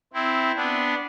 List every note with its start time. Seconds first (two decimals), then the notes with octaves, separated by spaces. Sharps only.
0.13 C4 E4
0.56 B3 D4